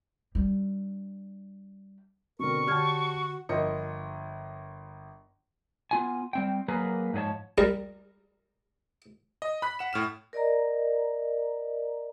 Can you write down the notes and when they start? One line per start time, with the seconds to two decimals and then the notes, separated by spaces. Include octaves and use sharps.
0.35 G3 D4
2.39 B2 D3 C4 A#4 C#6
2.67 D3 F#4 G4 C#5 A5 F6 G#6
3.49 G1 F3 A#4 D#5 C#7
5.91 B3 F4 G#5
6.33 G3 C4 G5
6.68 F#3 A#3 G#4 A#4 B4
7.13 G#2 F3 G#4 C#5 A5
7.58 G3 A#4
9.42 D#5
9.62 B5 F#6 B6
9.79 F#5 E7
9.93 A2 F6 E7
10.33 A#4 D5 D#5 A#5